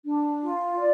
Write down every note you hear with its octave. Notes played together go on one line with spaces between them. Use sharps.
D4
F4
D5